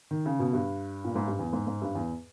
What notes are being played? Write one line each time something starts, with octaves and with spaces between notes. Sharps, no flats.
D#3
C#3
B2
G2
A#2
G#2
G2
E2
G#2
G#2
G2
E2